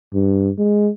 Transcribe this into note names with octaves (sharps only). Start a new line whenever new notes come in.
G2
G#3